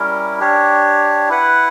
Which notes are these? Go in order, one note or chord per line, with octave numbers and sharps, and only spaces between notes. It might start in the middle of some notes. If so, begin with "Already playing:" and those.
Already playing: G3 C#4 E4 A#4
D4 G4 C#5
E4 B4 F#5